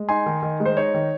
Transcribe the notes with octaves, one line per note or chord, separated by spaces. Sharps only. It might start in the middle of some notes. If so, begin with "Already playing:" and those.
Already playing: G#3
D#4 G#5 C6
D#3
D#3
G#3
C5
D#4 C#5
D#3